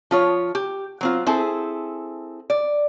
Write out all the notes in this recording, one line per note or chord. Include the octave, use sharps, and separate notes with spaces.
F3 F4 C#5
G4
F#3 C4 F4
C4 E4 G#4 A4
D5